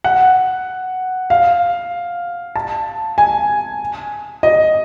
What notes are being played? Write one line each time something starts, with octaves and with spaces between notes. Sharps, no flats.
F#5
F5
A5
G#5
D#5